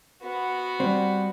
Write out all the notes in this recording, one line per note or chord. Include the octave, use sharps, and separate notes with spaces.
B3 F#4
G3 C4